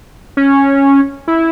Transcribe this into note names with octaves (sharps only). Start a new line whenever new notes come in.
C#4
E4